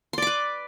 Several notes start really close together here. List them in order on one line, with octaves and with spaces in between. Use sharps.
C6 D5 D6 B4